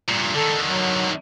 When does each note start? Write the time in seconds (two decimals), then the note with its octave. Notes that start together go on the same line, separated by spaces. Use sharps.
0.09 G2 A#2
0.34 D3 D#3 A4
0.64 F#3